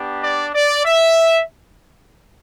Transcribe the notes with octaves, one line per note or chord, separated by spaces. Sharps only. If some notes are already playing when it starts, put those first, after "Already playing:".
Already playing: B3 D4 G4
D5
D5
E5